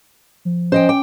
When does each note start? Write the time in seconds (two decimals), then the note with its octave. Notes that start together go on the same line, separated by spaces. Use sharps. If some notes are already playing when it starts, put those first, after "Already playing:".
0.45 F3
0.72 C#4 C5 D#5 G5
0.89 G5 D6